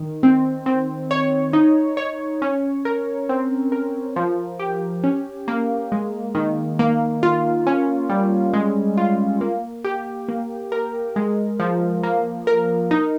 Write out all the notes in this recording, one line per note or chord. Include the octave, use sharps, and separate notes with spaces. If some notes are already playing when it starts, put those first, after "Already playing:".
Already playing: D#3
C4
C4
C#5
D#4
C#5
C#4
A#4
C4
A#4
F3
G4
C#4
A#3
G#3
D#3
A#3
F4
C#4
G3
G#3
F4
A#3
G4
A#3
A#4
G#3
F3
A#3
A#4
D#4